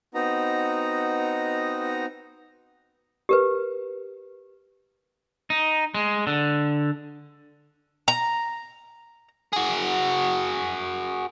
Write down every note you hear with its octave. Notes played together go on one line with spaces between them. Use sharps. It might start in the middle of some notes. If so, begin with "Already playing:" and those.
B3 C4 D#4 F#4 D#5 A#5
G4 A#4 B4
D#4
G#3
D3
A#5
F#4 G#4